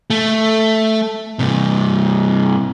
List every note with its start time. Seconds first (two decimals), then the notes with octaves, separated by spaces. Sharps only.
0.10 A3
1.39 G2 C3